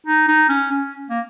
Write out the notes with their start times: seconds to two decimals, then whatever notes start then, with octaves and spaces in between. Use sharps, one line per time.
0.07 D#4
0.28 D#4
0.49 C#4
0.71 C#4
1.10 A#3